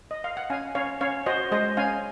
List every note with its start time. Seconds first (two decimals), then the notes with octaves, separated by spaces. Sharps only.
0.11 D#5
0.24 F5
0.37 F#5
0.50 C#4 F5 G#5
0.75 C#4 C#5 F5
1.01 C#4 C#5 F5
1.26 F#4 C5 D#5
1.52 G#3 C5 D#5
1.77 C#4 F5 G#5